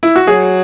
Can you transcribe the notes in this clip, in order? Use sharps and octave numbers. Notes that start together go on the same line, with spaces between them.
E4
F#4
F#3 G#4